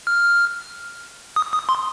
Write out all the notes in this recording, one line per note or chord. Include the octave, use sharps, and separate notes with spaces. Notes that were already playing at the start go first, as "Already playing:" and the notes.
F6
D#6
D#6
C6